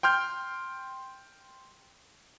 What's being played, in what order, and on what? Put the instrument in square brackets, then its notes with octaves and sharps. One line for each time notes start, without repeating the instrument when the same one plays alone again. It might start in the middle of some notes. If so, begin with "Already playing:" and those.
[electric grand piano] G5 C6 F6 G6